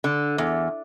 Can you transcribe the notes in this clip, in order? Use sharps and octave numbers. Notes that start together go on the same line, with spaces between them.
D3
E2